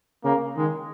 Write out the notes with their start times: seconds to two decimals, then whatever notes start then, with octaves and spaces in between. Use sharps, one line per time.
0.24 C#3 A#3
0.57 D#3 G#3